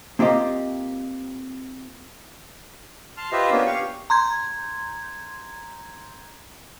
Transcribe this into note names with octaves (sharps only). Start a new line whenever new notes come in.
A#3 C4 F4 G4 D#5
A5 C6 F6
F4 G4 B4 C5 D#5 E5
A#3 B3 C#4 D4 F4
G4 F5 C#6
A#5 C6 G6 G#6